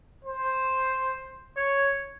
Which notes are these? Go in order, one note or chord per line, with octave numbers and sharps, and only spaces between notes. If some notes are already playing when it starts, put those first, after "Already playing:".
C5
C#5